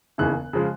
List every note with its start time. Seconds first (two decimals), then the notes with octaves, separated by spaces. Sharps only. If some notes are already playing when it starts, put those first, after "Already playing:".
0.18 E1 D#2 C#3 E3 F#6
0.53 C#3 F3 G#3